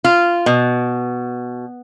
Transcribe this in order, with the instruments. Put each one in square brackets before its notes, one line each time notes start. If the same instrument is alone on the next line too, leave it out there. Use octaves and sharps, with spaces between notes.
[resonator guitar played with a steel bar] F4
B2